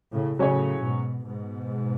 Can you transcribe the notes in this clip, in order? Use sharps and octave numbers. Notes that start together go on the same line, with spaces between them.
A2 C#3
A2 C#3 F#3 C#4 G#4 C#5
G#2 B2
G#2 B2